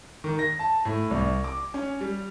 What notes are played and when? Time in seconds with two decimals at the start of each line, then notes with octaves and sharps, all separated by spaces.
0.24 D#3
0.39 A#6
0.59 A5
0.85 A2
1.11 C2
1.44 D6
1.74 C#4
2.01 G3